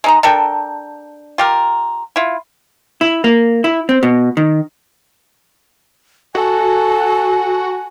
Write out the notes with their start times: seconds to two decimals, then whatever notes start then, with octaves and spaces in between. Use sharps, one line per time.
0.04 G#3 D#4 A#5
0.23 D4 A4 A#4 G5
1.38 F4 G4 A#4
2.16 E4 F4
3.01 E4
3.24 A#3
3.64 E4
3.89 C4
4.03 B2
4.37 D#3
6.35 F#4 A4 G#5